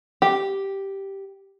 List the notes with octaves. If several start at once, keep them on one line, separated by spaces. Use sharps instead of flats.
G4